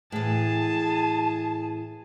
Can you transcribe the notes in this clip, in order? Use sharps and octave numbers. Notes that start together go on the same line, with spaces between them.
A2 E3 G#4 A5